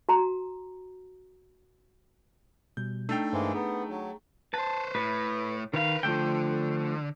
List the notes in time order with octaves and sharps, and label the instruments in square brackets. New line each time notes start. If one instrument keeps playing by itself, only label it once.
[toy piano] F#4 A#5
[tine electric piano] B2 G3 [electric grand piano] G6
[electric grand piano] A3 G5 [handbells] D4 D#4
[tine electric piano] G2 C5 [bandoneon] E3 G#3 A#3
[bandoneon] B3 [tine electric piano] G#4 A#5
[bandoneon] F#3
[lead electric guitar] B4 C5 [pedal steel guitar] A5
[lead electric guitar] A2 [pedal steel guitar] B4
[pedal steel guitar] D#3 F5 [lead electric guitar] A#4 B4
[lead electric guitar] D3 [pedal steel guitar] F3 A3 G5